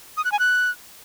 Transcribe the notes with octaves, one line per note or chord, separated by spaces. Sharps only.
D#6
F#6
G#5
F#6